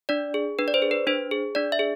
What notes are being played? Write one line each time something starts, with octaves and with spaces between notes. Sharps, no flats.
D4 D5
G#4
D4 B4
D5
C5
G#4
B4
D4 C5
G#4
D4 D5
E5
G#4